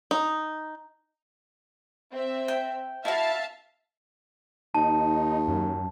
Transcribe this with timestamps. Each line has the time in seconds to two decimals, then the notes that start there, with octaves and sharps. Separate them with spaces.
0.11 D#4
2.13 C4 E5
2.48 G5
3.05 E4 F#4 E5 F5 A5
4.75 D#2 D#4 A5
5.48 F#2